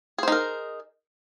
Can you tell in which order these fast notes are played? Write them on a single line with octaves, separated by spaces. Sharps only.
G#4 C5 D#4 A#4